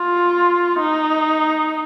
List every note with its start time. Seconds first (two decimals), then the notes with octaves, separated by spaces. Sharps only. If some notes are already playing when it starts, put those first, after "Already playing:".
Already playing: F4
0.80 D#4